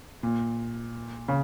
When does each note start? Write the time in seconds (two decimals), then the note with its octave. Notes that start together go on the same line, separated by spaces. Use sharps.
0.23 A#2
1.28 C#3